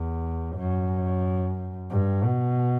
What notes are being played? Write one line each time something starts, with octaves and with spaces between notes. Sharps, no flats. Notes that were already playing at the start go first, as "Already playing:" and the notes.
Already playing: E2
F#2
G2
B2